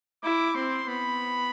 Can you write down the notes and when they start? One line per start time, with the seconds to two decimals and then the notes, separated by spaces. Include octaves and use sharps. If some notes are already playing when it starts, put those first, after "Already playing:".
0.23 E4 D6
0.55 C4 C6
0.88 B3 B5